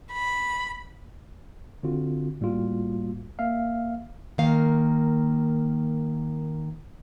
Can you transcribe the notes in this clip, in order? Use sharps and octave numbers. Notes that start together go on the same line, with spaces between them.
B5
D3 C4 F4 F#4
A2 G3 A#3 F4 F#4
A#3 E5 F5
D#3 A#3 F5